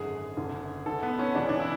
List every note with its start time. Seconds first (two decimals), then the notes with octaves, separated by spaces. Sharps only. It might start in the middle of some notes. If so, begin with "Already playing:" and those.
Already playing: G#1 F#2 D3 G#4
0.37 F#1 F#2 D3
0.86 D2 D3 A4
1.03 B3
1.19 C#4
1.35 E1 E2 C#3 E3 D4
1.49 D4
1.59 E4